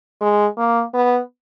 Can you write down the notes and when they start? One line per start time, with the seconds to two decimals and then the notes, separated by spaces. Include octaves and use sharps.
0.21 G#3
0.58 A#3
0.94 B3